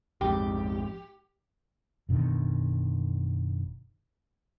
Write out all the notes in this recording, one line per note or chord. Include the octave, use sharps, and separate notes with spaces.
A#1 F2 G#2 G4
F#1 B2 D3 D#3